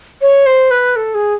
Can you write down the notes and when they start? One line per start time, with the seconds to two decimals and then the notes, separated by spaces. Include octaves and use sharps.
0.21 C#5
0.46 C5
0.71 B4
0.96 A4
1.14 G#4